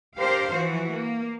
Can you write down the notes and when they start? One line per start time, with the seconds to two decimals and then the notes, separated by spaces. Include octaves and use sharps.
0.18 D4 G4 A#4 C5 F5
0.52 E3 F3 F#4
0.92 A#3